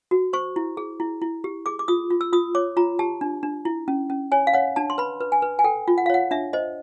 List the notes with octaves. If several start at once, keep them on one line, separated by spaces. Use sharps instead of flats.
F#4
C5 C#6
E4
G#4
E4
E4
G4
G#4 D6
D6
F4 D#6
F4
E6
F4 D#6
C#5 D6
F4 A#5
G4 A5
D4
D4
E4
C#4
C#4
C#5 G#5
F5
C#5 F#5
D4 A5
C6
B4 B5
B4
G#5
B4
G#5
A4 G5
F4
F#5
F5
C#5 F#5
D4 E5
C5 D#5